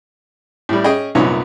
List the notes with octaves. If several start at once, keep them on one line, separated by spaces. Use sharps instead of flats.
A2 G3
C#4 G#4 D#5 G5
C2 F#2 A#2 B3 D#4 C#5